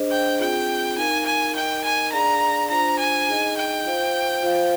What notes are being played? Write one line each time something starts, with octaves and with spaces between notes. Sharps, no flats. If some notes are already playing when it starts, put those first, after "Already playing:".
Already playing: D4 G#4 C5 D#5
G5
C4 F4 G#4 G5
D#4 A#4 F5 G#5
G#5
D#4 A#4 D#5 G5
G#5
D4 G#4 D5 F5 A#5
D4 F4 C5 A#5
G#5
D#4 G#4 D#5
G5
F4 C5 F5
F4 C5 F5